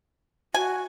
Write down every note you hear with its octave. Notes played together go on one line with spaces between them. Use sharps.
F#4 G#5